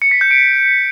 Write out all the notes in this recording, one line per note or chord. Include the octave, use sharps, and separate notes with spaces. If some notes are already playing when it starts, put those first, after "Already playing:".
C#7
B6
G6
D7